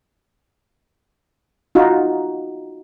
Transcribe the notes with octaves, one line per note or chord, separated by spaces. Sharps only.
D#4 F4 F#4